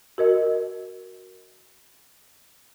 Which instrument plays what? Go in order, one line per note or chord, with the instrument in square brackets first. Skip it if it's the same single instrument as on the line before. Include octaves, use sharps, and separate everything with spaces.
[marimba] F#4 A#4 D#5